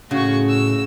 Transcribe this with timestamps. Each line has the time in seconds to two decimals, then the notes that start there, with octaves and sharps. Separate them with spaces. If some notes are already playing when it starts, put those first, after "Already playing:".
0.11 A2 C#3 F#4 C#6
0.49 E6